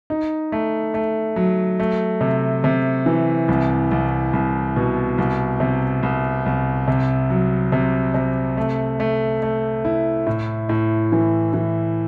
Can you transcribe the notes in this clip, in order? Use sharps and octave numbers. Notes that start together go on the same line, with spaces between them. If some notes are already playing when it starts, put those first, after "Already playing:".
D#4
A3
A3
F#3
A3
C3
C3
E3
C2
C2
C2
B2
C2
C3
C2
C2
C3
F#3
C3
C3
A3
A3
A3
E4
A2
A2
E3
E3